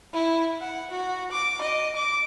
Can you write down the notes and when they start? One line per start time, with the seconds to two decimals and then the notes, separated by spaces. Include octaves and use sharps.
0.13 E4
0.61 F#5
0.90 F#4
1.31 D6
1.61 D#5
1.96 D6